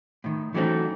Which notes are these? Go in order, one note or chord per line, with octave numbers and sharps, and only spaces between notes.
A2 D#3
E3 F#3 A3 C4 C#4 D#4